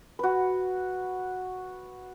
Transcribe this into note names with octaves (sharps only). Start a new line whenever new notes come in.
F#4 B4